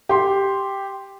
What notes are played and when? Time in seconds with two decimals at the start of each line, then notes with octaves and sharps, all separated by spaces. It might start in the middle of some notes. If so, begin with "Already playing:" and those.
0.09 G4 C6